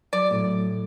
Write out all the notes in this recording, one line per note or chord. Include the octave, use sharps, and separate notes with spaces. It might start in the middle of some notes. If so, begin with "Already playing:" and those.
F#3 D5
A2